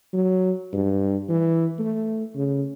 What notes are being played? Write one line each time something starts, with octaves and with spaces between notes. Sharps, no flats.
F#3
G2
E3
A3
C#3